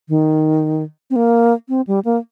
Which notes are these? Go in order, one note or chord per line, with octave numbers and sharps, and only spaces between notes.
D#3
C4
A#3
C4
G3
A#3